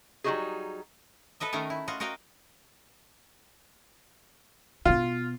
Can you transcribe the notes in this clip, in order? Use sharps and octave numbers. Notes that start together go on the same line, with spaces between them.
F#3 G3 C4 D#4 F#4 G#4
A4 B4 D#5 E5
D#3 A3 C#4 A#4 D#5
E4
F4 F#4 D#5
F#4 A#4 D#5 F5 G5
B2 B3 F4